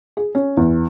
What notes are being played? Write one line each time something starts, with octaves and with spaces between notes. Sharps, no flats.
G#4
C#4
E2